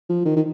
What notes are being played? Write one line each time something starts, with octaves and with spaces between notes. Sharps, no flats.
F3
D#3
D#3